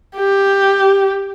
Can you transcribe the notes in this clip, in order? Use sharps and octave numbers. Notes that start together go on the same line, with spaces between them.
G4